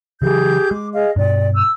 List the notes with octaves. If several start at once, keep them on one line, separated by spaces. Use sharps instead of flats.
C#3 E3 F#3 G4 G#4 G6
G#3 D6
G#4 D#5 F5
G2 B2 D5
E6